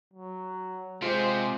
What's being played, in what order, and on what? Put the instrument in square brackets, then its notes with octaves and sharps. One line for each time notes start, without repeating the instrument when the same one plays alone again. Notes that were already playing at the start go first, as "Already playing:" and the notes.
[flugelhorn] F#3
[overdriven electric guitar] C3 [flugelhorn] G#3 [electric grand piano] F4 [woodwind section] G4 C5